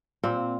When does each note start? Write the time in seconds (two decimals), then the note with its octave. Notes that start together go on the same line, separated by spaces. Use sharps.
0.24 A#2 C4